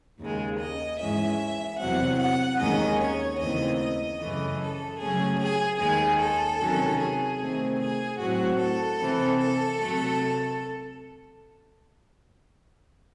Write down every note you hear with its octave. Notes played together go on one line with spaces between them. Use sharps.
D#2 C#3 G#3
D#5
G#2 E3 G#3 C#4 E5
E2 C3 F#3 C4 F#5
F#5
D#2 D#3 G#3 C#4 D#5
C#5
D#2 C#3 E3 A3 C4 D#5
D#5
F#2 C#3 E3 A3
A4
C#3 F#3 A3 C#4 G#4
G#4
D#2 D#3 G#3 G#4
A4
C3 D#3 F#3 C#4
G#4
C3 D#3 A3 C4
G#4
A2 F#3 C4 F#4
A4
C3 E3 C4
A4
C3 F#3 A3